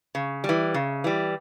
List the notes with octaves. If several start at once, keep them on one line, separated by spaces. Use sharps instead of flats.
C#3
G3
E3
C#3
E3 G3